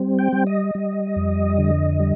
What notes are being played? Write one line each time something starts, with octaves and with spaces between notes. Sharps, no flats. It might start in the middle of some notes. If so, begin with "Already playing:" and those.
Already playing: G3 C4
G5
G3
D#5
G3
F2
D3
G3